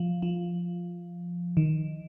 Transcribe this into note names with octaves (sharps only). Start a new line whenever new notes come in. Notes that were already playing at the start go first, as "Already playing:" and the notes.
Already playing: F3
F3
D#3